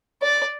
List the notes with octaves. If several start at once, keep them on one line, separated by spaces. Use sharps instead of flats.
D5